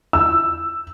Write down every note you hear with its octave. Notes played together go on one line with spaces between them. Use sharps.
E6